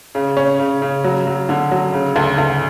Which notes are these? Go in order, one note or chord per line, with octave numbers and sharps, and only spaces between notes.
C#3
C#4
C#3
C#3
F#3
F#3
D3
F#3
C#3
D2
D2